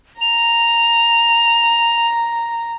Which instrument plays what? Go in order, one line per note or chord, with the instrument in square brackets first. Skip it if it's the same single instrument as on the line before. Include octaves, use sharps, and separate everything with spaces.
[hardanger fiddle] A#5 [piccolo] F7